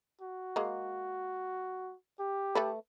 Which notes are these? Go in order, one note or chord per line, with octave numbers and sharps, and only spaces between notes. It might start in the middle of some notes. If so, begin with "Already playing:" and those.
F#4
G#3 A#3
G4
A3 A4 B4